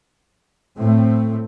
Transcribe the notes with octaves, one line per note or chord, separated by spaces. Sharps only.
A2 A3 C4